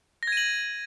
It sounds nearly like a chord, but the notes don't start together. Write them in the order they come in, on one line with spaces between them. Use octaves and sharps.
A#6 G#6 D#7 F#7